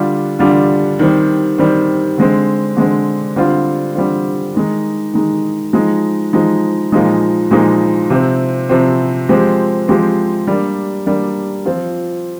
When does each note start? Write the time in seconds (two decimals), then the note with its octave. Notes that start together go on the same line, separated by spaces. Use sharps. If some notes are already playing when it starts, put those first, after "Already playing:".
Already playing: D3 G3 D4 F4
0.39 D3 G3 D4 F4
0.99 D#3 G3 C4
1.58 D#3 G3 C4
2.18 D3 G#3 C4
2.77 D3 G#3 C4
3.36 D3 G3 C4 F4
3.95 D3 G3 C4 F4
4.54 D#3 G#3 D#4
5.13 D#3 G#3 D#4
5.73 F3 G#3 D#4
6.33 F3 G#3 D#4
6.92 A#2 F3 G#3 D#4
7.51 A#2 F3 G#3 D#4
8.10 C3 F3 C4
8.69 C3 F3 C4
9.29 F3 G#3 C4 G4
9.88 F3 G#3 C4 G4
10.47 G3 A#3 D4
11.06 G3 A#3 D4
11.66 F3 C4 F4